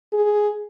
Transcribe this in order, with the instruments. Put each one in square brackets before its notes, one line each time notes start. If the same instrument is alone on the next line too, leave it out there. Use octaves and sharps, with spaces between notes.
[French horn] G#4